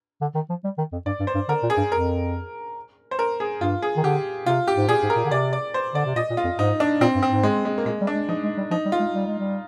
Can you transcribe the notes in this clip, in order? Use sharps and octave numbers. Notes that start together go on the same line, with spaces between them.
D3
D#3
F3
G3
D#3
F2
G2 D5
G2
C5
G2
D3 A#4
A#2
G#4
G2
F2 A#4
C5
A#4
G#4
G2 F4
G#4
D#3
D3 G4
C3 F4
G4
G#2
A#2 G#4
G#2
A#4
A#2
D3
C3 D5
D5
C5
D3 D5
C3
A#2 D#5
A#2
F4
F2
G#2 D#4
D4
A#2 C4
G2
C4
G#2
G#3
G#3
A#3
A#2 G#3
G3
D4
G#3
F3 D#4
G#3
G3
F3 D#4
G3
F4
G#3
G3
G#3
G3